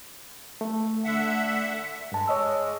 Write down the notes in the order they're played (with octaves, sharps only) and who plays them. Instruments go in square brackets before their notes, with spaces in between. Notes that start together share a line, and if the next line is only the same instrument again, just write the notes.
[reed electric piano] A3
[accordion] D3 E5 F#5
[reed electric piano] G2 A5 [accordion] G#3
[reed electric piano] C#5 D#5 E6